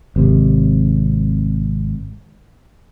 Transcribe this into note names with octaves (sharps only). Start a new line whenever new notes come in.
G#1 C3